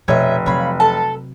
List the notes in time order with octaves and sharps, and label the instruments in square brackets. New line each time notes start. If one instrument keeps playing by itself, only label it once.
[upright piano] F1 [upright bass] B2 [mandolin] C#5 D#5 E5
[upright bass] C3 F#3 [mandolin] C#5 F5 B5
[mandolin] A4 A5